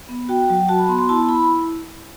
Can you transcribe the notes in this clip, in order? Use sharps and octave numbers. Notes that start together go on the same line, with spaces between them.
B3
F#4 G5
F#3
F#4 A5
B5
B3 C6
C6
E4 A5
E4 B5